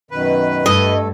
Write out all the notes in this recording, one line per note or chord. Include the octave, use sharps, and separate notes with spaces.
F#2 B2 D#3 B4
G2 A3 A4 D#5